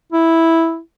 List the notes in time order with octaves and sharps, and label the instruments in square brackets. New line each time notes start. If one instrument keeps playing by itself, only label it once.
[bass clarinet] E4